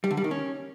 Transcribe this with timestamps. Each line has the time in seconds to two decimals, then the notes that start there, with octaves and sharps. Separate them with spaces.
0.04 G3
0.11 D3
0.17 G3
0.24 D#3
0.31 C#4